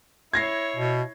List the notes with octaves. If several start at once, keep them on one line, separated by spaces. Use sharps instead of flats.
E4 C#5 G#6 A#6 C7
B2